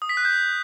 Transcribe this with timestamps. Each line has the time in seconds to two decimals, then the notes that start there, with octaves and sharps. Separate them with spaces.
0.02 D#6
0.09 B6
0.17 F#6
0.25 G6